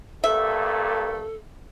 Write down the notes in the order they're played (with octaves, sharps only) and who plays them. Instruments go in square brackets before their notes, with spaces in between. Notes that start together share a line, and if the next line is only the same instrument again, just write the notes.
[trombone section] G2 A3 A#3 [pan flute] A4 [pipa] E5